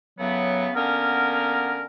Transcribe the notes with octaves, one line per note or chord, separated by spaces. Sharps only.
A2 C#3 F#3 B3
D3 A#3 B3 C#4 A#4